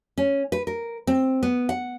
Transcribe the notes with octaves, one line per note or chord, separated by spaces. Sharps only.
C#4
B4
A#4
C4
B3
F#5